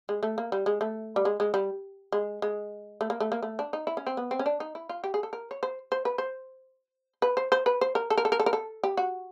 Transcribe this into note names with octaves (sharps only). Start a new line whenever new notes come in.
G#3
A3
A#3
G3
G#3
A3
G3
G#3
G#3
G3
G#3
G#3
A3
A#3
A3
A#3
A3
D4
D#4
E4
C#4
C4
B3
C4
C#4
D4
D#4
E4
F4
G4
G#4
A4
A#4
C#5
C5
C5
B4
C5
B4
C5
C5
B4
C5
A#4
A4
A#4
A4
A#4
A4
A#4
A4
G4
F#4